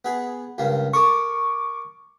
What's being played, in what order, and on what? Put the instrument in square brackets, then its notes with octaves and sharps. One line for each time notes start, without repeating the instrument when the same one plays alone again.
[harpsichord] B3 G#4
C#2 G2 A#3
[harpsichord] A4 A#4 [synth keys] C#6 D6